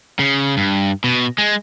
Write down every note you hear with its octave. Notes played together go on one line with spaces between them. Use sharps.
C#3
G2
B2
G#3